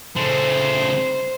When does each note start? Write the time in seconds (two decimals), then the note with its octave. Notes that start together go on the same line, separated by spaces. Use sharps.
0.17 C#3 A3 C5